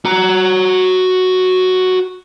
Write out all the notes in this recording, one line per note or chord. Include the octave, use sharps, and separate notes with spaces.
F#4 A#5